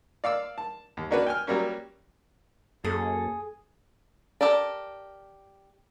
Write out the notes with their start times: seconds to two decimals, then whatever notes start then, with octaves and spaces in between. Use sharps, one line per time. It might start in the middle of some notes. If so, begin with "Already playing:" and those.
0.24 D5 F5 D6 E6
0.58 A5
0.97 D#2
1.11 A#3 C#4 D4 F#4 B4
1.26 G5 G#5 F6
1.47 F#3 G3 A#3 C#4
2.85 F#2 A#3 G#4 A4
4.41 G4 A4 A#4 D5